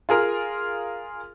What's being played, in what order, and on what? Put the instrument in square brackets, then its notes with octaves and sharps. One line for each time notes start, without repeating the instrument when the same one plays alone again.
[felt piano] F4 G#4 A#4